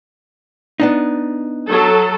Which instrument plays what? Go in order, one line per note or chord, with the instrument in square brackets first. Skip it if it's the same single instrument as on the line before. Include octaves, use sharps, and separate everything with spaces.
[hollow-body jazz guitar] B3 D4 D#4
[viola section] F#3 A4